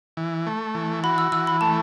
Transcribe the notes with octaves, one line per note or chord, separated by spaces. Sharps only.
E3
A3
E3
F#4 B5
E6
E3 E6
B5
A3 A5